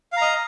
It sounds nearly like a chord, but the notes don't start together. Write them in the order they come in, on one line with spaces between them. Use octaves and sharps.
F5 A#5 D#5